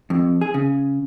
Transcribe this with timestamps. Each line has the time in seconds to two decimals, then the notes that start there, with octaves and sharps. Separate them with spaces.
0.10 F2
0.41 G#4
0.54 C#3